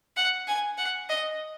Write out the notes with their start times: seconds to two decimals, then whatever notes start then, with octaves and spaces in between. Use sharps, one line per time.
0.17 F#5
0.48 G#5
0.78 F#5
1.09 D#5